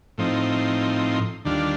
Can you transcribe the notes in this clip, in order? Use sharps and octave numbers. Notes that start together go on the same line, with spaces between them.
A2 F3 C4 D#4
D#2 D3 G3 D4 F4